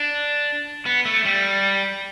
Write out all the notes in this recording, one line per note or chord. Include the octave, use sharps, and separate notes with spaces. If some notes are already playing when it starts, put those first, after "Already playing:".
Already playing: D4
B3
A3
G3